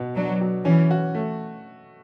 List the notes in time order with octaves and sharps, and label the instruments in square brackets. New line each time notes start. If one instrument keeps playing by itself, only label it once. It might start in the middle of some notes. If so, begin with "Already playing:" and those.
Already playing: [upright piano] B2 B3
[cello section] F#3 [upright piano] D4
[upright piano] F#3
[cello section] E3 [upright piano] C#4
[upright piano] F#4
A3